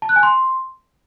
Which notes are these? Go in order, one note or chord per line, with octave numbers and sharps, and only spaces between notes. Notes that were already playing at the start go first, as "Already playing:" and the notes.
A5
F#6
G#5
C6